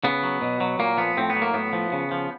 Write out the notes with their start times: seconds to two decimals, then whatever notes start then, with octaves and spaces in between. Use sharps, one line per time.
0.04 C#3 B3
0.23 F#3
0.42 B2
0.60 F#3
0.79 A#2 A#3
0.97 F3 B3
1.17 A2 C4
1.30 B3
1.36 F#3
1.42 A#3
1.54 A2 B3
1.73 F3
1.92 C#3
2.11 F3